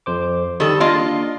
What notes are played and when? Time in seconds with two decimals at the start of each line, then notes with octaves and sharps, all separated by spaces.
0.06 F2 C5 D6
0.60 D#3 G3 A4
0.80 A#3 D4 F4 D#5